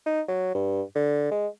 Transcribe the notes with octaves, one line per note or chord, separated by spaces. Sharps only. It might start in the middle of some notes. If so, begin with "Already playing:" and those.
D#4
F#3
G2
D3
G#3